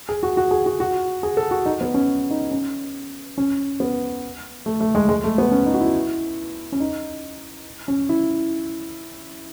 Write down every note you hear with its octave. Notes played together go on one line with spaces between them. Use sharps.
G#4
F#4
F#4
G#4
F#4
F#4
G#4
A4
F#4
D#4
B3
C#4
D#4
C#4
C#4
B3
A3
A3
G#3
G#3
A3
B3
C#4
D#4
F#4
E4
C#4
D#4
C#4
E4